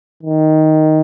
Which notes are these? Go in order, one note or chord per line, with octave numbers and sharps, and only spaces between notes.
D#3